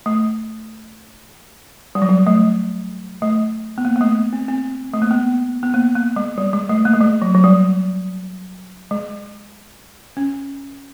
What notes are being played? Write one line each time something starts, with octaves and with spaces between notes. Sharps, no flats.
A3
G3
F#3
G3
A3
A3
B3
A#3
A#3
A3
C4
C4
A3
A#3
B3
B3
A#3
A#3
G#3
G3
G#3
A3
A#3
A3
G#3
F#3
F#3
G3
G#3
C#4